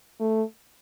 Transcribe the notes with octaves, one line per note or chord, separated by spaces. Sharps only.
A3